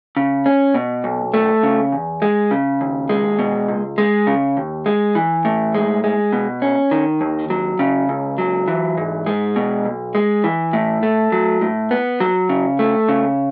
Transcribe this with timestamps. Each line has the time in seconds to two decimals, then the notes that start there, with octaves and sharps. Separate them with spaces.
0.17 C#3
0.46 C#4
0.74 B2
1.04 B1
1.34 A3
1.63 C#3
1.92 E2
2.22 G#3
2.51 C#3
2.81 D#2
3.09 G#3
3.39 B2
3.69 C#2
3.98 G#3
4.27 C#3
4.57 D#2
4.86 G#3
5.15 E3
5.45 A2
5.75 G#3
6.04 G#3
6.33 B2
6.62 C#4
6.91 D#3
7.21 D#2
7.50 F#3
7.79 C#3
8.09 C#2
8.38 F#3
8.68 E3
8.98 G#2
9.26 G#3
9.56 B2
9.85 B1
10.15 G#3
10.44 E3
10.73 A2
11.03 A3
11.32 F#3
11.61 A2
11.91 B3
12.20 F#3
12.49 C#3
12.79 A3
13.09 C#3